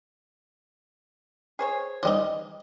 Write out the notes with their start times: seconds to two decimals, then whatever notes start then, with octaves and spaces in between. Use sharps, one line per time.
1.59 G#4 C5 C#5
2.03 E3 G3 D#4